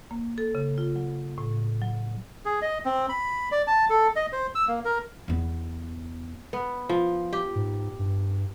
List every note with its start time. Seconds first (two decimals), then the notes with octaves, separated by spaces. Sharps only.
0.11 A#3
0.38 A4
0.55 C#3
0.78 F4
0.96 F#3
1.38 A2
1.82 F#3
2.45 G#4
2.62 D#5
2.85 C4
3.09 B5
3.52 D5
3.67 A5
3.90 A4
4.16 D#5
4.32 C5
4.55 E6
4.68 A#3
4.85 A#4
5.28 E2 B3
6.53 B3
6.89 F3
7.33 G4
7.56 G#2
7.99 G2